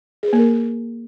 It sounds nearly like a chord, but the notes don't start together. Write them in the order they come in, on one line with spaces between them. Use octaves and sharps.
G#4 B4 A#3 A#4